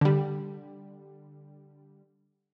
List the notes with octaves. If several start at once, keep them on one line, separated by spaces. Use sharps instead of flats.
D3 G3